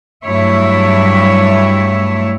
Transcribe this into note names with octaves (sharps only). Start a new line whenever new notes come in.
G2 F#3 A3 E4 C#5 E5